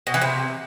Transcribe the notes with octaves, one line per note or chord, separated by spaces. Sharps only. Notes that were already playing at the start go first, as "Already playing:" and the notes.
B2
E3
C3